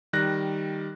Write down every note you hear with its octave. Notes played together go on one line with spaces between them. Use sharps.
D#3 G3 F#6 A#6